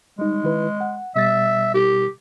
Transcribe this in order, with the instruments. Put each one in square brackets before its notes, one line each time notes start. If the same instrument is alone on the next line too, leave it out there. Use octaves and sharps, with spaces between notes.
[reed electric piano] G3 D#4 [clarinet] G#3
[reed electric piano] D#3 E4 B4
F#5
[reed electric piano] B2 G3 A6 [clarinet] E5
[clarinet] G4